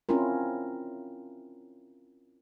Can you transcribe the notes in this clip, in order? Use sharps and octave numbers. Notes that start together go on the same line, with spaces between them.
C4 C#4 E4 F4 A#4